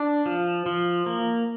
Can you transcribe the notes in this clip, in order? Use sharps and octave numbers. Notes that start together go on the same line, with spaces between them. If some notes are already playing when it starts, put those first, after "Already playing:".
Already playing: D4
F3
F3
A#3